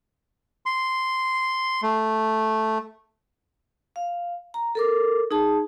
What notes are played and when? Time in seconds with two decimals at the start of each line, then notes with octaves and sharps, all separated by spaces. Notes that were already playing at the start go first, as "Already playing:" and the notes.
0.66 C6
1.83 A3
3.96 F5
4.54 A#5
4.75 A4 A#4 D6
5.31 D#4 G#4 A5